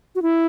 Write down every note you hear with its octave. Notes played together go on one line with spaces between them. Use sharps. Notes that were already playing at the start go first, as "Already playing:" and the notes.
F#4
E4